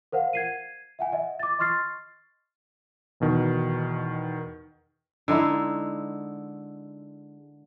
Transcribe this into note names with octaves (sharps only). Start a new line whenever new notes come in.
A#4 C5 F5 F#5
G#6 C7 D#7
E5 F#5 G#5
D#5 E5
D6 A6
D#5 C6 C#6 F6 A6 C7
E2 B2 D#3
D3 G#3 D#4 E4